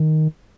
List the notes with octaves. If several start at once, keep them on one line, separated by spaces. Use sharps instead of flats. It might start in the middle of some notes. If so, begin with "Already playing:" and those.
Already playing: D#3